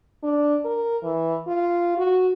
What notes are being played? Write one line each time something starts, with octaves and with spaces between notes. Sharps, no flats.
D4
A#4
E3
F4
F#4